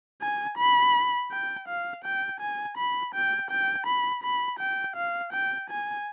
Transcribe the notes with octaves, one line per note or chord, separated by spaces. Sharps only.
G#5
B5
G5
F5
G5
G#5
B5
G5
G5
B5
B5
G5
F5
G5
G#5